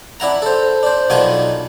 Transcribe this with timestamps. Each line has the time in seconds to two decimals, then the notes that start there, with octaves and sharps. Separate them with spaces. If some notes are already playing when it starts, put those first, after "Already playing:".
0.20 D4 E4 F#5 A#5
0.42 A4 C5
0.83 D4 C5
1.10 B1 D#3 D4 F4 F#5 G#5